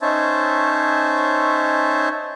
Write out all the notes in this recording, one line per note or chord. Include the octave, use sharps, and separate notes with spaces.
C#4 D#4 C5 C#5 E5 A5